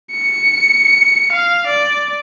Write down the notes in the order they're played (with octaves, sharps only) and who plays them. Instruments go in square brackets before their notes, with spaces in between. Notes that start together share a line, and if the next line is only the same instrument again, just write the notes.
[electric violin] C#7
F5
D5